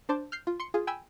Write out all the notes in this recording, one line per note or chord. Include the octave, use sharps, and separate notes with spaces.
D4 C5 A5 C6 D6
F6 G6 C7
F4
C6 C#7
F4 G#4
G5 G#5 B5 E6